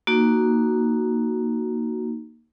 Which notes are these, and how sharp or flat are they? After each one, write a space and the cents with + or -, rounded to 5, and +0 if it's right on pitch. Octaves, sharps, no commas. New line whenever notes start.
A#3 +0 D#4 -5 F#4 +0